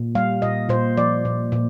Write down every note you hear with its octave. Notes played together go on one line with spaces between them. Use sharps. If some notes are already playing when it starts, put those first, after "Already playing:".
Already playing: A#2
G3 F5
A#2 D#5
A#2 C5
F3 D5
A#2
A#2